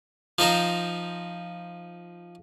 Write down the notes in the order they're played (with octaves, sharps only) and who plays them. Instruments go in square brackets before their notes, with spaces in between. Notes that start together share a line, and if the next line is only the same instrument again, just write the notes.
[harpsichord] F3 D#4 C5 A#5